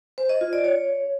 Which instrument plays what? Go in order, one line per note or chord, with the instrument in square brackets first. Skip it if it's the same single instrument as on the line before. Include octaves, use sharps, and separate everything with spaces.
[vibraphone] C5
D#5
F4
D5
C#5